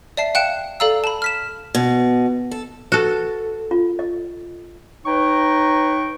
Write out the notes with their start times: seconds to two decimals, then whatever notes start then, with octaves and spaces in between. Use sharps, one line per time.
0.17 D5 E5 A5 C7
0.35 F5 G5 F#6 C#7 E7
0.80 A4 D5 F5 A#5 E6
1.04 A5 B5
1.22 F6 B6 E7
1.75 B2
2.51 A4
2.92 F#4 A4 B4
3.71 F4
3.99 D#5
5.06 D#4 B4 C#5 G5 A#5 C#6